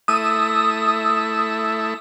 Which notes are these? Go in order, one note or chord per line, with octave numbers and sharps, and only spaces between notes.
A3 E4 D#6 E6